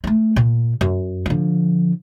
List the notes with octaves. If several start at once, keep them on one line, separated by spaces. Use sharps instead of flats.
G#3 A3
A#2
F#2
D3 F3